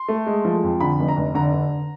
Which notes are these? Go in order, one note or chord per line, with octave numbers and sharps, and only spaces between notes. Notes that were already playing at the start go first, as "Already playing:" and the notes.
Already playing: C6
A3
G#3
F3
F2
D3 B5
F1
A#5
F1
D3 A#5
D3